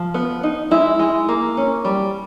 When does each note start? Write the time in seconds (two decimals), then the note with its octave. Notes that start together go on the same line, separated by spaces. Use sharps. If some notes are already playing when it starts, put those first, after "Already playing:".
Already playing: F3
0.14 B3
0.43 D#4
0.71 G#3 E4
0.99 G#3
1.29 A#3
1.57 C#4
1.85 G3